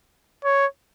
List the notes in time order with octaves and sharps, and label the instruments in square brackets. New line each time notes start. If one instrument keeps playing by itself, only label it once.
[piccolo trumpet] C#5